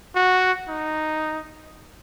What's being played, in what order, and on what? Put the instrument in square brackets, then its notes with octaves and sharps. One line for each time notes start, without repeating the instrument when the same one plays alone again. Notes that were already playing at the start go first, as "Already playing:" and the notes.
[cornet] F#4
D#4